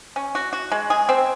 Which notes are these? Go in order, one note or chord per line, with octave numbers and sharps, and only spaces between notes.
C#4
F#4
F#4
G#3
G#4
C4